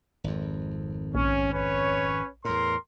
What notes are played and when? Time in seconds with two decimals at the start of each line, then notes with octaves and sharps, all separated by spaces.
0.24 G#1 F2
1.15 A#1 C#4
1.52 C#4 B4 C#5
2.45 E2 A2 A#4 C6